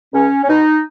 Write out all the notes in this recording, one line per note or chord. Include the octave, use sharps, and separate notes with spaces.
C#2 C#4
C#4
B2 D#4